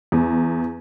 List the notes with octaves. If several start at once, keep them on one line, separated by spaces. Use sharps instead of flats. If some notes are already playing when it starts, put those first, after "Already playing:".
E2